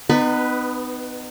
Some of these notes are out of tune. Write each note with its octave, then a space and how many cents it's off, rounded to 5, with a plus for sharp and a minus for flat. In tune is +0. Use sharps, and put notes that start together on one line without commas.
B3 +30 D#4 -25 B4 +0